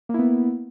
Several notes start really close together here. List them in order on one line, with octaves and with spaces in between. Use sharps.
A#3 E4 B3